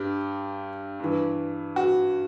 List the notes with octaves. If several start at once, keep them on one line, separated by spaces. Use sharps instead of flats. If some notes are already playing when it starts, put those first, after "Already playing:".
Already playing: G2 G4
G2 E3
F#4